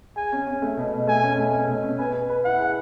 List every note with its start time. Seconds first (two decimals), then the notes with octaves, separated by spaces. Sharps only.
0.16 G#4 G#5
0.32 C#4
0.47 C#4
0.62 A3
0.77 B2
0.93 B2
1.07 A3 G#5
1.23 C#4
1.38 A3
1.53 C#4
1.68 B2
1.83 C#4
1.98 B4 G#5
2.14 B4
2.29 B4
2.45 E4 F#5
2.60 G#4